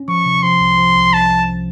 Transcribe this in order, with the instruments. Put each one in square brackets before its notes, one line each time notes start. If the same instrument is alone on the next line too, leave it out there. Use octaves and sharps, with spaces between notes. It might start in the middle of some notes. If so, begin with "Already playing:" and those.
Already playing: [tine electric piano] C#4
[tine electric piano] F3 [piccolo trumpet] C#6
[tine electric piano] C3
[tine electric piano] F3 [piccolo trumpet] C6
[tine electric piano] C2
F3
C2
[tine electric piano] C2 [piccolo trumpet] A5
[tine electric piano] C2